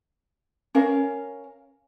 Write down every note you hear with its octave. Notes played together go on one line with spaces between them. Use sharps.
C#4 A#4 F5